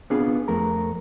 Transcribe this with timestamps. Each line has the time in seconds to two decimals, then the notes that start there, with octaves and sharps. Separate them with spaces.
0.10 B3 C4 D4 F4 G#4 B4
0.48 F2 A3 A#4 A#5